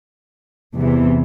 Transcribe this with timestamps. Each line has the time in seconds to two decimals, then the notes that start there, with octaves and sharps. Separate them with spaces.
0.77 E2 C3 E3